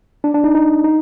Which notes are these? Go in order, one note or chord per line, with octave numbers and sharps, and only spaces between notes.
D4
D4
D#4
D#4
D#4